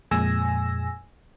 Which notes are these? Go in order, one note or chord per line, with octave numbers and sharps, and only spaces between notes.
F2 A#2 G#3 G#5 E6 A#6